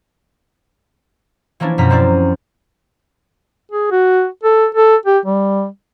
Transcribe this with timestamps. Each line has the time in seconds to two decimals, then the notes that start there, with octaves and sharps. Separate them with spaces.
1.60 E3 F3 A#3 C#4 D4 E4
1.78 F#2 B2 F3 A#5 B6
1.90 C4 C#4 E4 D5
3.72 G#4
3.92 F#4
4.44 A4
4.75 A4
5.06 G4
5.26 G3